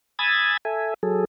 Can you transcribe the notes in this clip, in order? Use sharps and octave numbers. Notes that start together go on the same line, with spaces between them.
G#5 B5 D#6 E6 G#6 A6
A4 E5 G#5
F#3 G#4 A4